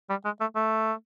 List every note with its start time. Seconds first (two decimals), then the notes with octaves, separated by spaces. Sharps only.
0.10 G3
0.25 G#3
0.40 A3
0.56 A3